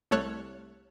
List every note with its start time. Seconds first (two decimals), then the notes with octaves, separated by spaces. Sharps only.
0.11 C2 A3 A4 C#5 F6 F#6